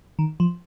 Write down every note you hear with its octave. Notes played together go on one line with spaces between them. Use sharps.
D#3
F3